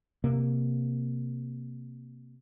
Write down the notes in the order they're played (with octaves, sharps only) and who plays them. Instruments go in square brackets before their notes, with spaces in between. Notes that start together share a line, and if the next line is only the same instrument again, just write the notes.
[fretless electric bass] C3 A#3